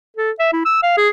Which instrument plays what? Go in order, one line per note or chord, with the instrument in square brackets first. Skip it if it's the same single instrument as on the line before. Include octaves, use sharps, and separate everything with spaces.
[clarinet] A4
E5
E4
E6
F5
G#4